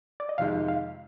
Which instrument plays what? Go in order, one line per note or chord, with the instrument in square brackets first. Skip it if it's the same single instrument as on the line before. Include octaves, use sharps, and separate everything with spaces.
[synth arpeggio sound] D5
D#5
[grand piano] F2 C3 D#3 G#3 D#4 [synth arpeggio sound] F5
[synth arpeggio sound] F5